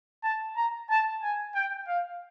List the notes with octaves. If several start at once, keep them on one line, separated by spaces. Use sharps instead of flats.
A5
A#5
A5
G#5
G5
F5